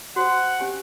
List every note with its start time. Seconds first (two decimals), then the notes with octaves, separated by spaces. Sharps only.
0.16 F#4 C5 F#5 D#6
0.59 C#4 G4 G#5